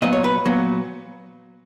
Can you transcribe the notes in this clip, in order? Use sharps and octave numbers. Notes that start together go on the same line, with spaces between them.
A#2 F#3 B3 D#5
C#5
B4
A#2 F#3 B3